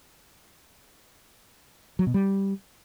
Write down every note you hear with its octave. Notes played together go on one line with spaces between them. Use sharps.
F#3
B2
G3